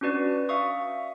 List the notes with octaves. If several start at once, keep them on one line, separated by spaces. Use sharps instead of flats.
C#4 D4 F#4 B4 D5
E5 F5 C#6 D#6